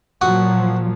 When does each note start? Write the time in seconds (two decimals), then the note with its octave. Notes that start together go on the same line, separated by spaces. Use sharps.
0.21 A#2 F3 F#3 F#4 D#6